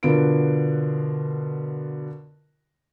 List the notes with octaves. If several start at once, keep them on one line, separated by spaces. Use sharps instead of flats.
B2 D3 B3 F4 A#4 D7